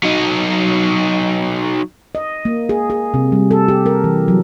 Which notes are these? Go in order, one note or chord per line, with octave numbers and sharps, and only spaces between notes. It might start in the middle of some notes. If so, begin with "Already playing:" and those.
F#3 D#4
D#5
A#3
G#4
G#4
C3
G3
A4
G4
A#4
E3
F#3